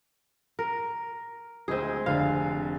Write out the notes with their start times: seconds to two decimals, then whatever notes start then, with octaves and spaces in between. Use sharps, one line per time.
0.59 A#4
1.68 D2 G#3 C4 G#4
2.06 F1 D3 F5 G#5